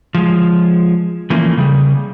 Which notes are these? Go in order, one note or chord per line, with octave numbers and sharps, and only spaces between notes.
F3 G#3
E3 F3 A3 A#3 C#4
C#3 G3 G#4